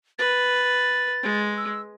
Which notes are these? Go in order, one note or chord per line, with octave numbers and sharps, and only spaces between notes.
B4 A6
G#3
E6